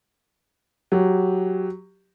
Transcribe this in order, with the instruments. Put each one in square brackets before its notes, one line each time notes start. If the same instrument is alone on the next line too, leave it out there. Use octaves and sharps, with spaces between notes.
[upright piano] F#3 G4